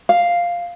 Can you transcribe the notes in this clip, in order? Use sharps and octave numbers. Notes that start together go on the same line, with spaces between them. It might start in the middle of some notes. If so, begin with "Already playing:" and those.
F5